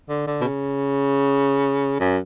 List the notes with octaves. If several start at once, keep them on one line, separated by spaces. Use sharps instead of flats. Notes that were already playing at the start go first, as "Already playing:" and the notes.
D3
D3
B2
C#3
F#2